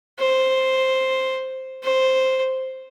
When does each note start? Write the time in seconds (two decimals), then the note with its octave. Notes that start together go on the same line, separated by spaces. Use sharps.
0.19 C5
1.83 C5